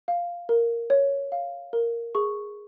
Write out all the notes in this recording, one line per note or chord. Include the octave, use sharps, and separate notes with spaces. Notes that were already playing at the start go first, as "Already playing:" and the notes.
F5
A#4
C#5
F5
A#4
G#4 C#6